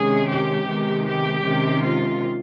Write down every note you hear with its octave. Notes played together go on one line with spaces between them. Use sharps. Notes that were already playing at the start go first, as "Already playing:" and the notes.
Already playing: C3 D#3 G#3 C#4 G#4
G4
C3 D#3 G#3 B3
G4
C3 D#3 G#3 C#4
F4